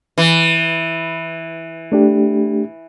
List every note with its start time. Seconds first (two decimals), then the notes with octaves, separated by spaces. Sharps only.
0.18 E3
1.92 A3 D4 G4